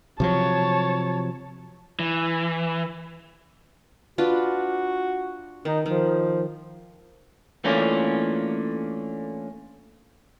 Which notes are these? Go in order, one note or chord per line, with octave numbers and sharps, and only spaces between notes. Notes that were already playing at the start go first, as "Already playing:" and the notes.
C3 F3 F#3 C#5 A5
E3
D4 F4 F#4 B4
D#3 D#4
D#3 F3
E3 A3 A#3 C#4 D4 F4